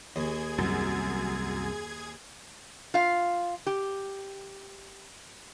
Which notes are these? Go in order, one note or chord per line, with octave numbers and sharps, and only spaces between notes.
D#2 G#4 G#6
C2 F#2
F4 F5
G4